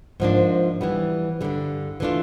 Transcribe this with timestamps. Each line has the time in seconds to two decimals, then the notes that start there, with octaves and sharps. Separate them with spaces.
0.20 G#2 F3 A#3 D4
0.81 E3 G3 B3
1.41 G2 D3 G3
2.00 E3 A3 D4 F4